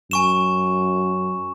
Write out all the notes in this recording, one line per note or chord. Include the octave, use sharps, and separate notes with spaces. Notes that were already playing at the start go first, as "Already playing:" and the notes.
F#2 G#5 C#6 E7